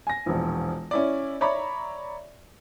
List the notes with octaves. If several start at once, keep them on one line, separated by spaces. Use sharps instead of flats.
G#5 A#6
E1 A#1
C#4 E4 D5
C#5 D5 E5 A#5 B5 C#6